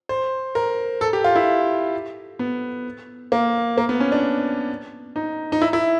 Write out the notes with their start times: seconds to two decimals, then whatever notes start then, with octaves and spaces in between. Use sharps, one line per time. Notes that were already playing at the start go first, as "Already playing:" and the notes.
0.09 C5
0.55 A#4
1.01 A4
1.13 G4
1.24 F4
1.36 E4
2.39 B3
3.32 A#3
3.78 A#3
3.89 B3
4.00 C#4
4.12 D4
5.16 D#4
5.52 D#4
5.62 E4
5.73 E4